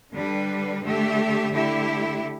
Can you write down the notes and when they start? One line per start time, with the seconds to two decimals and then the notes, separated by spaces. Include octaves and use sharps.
0.12 D3 G3 D4 B4
0.82 D3 A3 G4 E5
1.52 D3 A3 E4 G4 E5